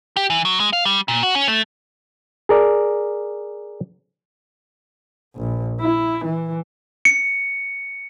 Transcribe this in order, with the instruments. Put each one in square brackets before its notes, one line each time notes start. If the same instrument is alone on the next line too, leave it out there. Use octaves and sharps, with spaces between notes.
[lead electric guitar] G4
E3
F#3
G#3
F5
G3
A#2
F#4
C#4
A3
[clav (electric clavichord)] G#4 A#4 D5
[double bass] A#1
E4
E3
[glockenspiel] C#7